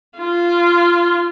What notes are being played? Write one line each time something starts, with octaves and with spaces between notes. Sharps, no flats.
F4